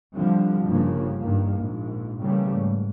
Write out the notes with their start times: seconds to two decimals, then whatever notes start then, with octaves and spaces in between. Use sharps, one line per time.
0.15 D3 F3 G3 C4
0.67 G1 G2 C#3 F3 A#3
1.19 G2 D#3 A#3
1.53 A#1 G#2
2.21 A#2 C#3 E3 G3 A3 A#3
2.53 G#2